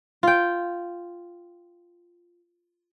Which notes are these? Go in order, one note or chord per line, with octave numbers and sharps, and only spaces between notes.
F4 G5